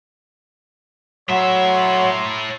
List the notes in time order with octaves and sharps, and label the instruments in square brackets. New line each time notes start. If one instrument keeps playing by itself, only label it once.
[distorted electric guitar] A2 E5 [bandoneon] F#3 [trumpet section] C#5 A#5 C6